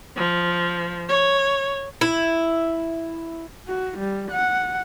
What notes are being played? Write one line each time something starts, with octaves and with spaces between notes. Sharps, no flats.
F3
C#5
E4
F#4
G3
F#5